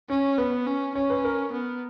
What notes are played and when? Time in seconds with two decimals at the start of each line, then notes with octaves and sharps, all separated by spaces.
0.09 C#4 C#5
0.38 B3 B4
0.66 C#4
0.95 C#4 C#5
1.10 B4
1.24 A#4
1.53 B3